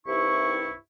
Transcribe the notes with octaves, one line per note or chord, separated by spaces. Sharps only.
C2 G2 C3 D#4 E4 C#6